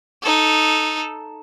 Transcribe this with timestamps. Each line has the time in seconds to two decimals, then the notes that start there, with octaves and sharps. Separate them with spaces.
0.22 D#4 A4